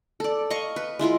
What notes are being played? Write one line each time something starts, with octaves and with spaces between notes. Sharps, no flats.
A4 D5
D#5 F5 A#5 C#6
B4
G#3 E4 F4 A#4